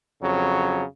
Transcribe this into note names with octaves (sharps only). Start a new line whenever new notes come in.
F2 C#3 F#3